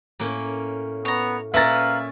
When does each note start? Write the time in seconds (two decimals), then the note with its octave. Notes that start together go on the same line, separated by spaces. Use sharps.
0.20 A2 A#3 C#4
1.05 B3 C#5 A#5
1.54 A#2 C#4 F4 B4 E5 F5 A#5 A6